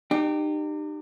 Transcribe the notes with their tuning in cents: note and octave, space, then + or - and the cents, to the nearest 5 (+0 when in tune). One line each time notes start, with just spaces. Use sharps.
D#4 -40 G4 +0